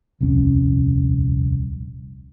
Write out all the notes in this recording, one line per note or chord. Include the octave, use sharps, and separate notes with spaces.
D#1 C2 F2 C#4